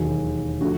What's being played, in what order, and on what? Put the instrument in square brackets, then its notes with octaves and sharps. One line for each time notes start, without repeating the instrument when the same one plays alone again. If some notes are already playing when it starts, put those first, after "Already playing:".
Already playing: [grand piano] E1 D#2 D#3 F#3 G#4
D3 F3 A3 F#4